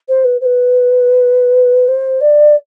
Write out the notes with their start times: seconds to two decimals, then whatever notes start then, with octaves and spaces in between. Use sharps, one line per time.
0.08 C5
0.24 B4
0.41 C5
0.45 B4
1.88 C5
2.21 D5